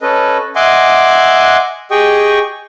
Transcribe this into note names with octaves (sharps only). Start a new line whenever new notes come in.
C#4 A4 B4 D#5
D#5 E5 F#5 G#5 C6 D6
G4 G#4 D#5 G5 C#6 D#6